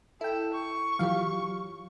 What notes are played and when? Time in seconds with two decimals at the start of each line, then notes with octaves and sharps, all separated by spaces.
0.21 E4 A4 G5
0.54 C#6
0.99 E3 F#3 F4 G4 F5